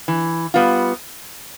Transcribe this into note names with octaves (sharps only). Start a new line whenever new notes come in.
E3
G3 B3 F4